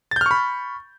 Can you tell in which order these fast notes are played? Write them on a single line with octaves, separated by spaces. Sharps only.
A6 G6 F6 C#6 B5